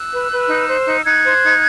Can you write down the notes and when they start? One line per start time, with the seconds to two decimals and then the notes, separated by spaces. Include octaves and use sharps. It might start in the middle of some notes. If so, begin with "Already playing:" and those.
Already playing: E6 F#6
0.12 B4
0.31 B4
0.49 D#4
0.68 C5
0.87 D#4
1.05 D#4 F#6 G#6
1.25 C5
1.42 D#4